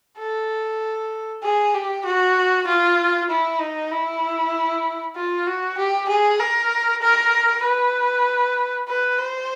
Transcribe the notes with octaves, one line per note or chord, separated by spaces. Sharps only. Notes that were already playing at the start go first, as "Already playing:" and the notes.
A4
G#4
G4
F#4
F4
E4
D#4
E4
F4
F#4
G4
G#4
A#4
A#4
B4
B4
C5